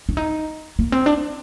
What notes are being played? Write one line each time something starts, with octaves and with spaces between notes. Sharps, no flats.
D4
D#4
A#3
C4
D4